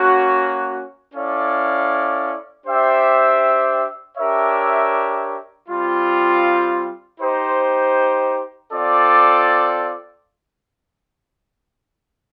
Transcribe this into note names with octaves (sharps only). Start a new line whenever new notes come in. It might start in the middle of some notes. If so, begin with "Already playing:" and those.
Already playing: A#3 C#4 F#4
C#4 E4 A4 D5 F5
D4 G4 C5 E5 G5
D4 G4 A#4 C#5 E5
G3 C4 F4
D#4 G4 C5
C4 F4 A4 D5